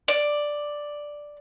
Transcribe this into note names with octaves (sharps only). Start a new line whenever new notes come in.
D5